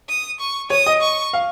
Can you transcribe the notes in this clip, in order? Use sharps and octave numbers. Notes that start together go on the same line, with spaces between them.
D#6
C#6
C#5 D#6
D#5
C#6
F5